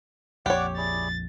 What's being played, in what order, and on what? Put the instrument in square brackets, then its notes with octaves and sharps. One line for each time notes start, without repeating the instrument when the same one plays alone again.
[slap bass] A#1 F2 [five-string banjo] G4 C#5 [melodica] D5 F#5 D6
[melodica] E4 G#4 D5 [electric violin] A6